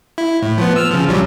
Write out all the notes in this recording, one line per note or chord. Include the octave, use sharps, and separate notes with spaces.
E4
A2
F3 B3
E6 F6
C#3 F3
B1 F#3 G3